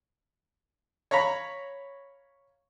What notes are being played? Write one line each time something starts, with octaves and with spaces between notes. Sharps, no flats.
C#5 F5 A#5 B5